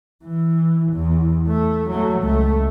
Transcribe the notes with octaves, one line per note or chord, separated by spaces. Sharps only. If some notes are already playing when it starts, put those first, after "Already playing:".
E3
E2
A3
F#3 A3
C#2 A3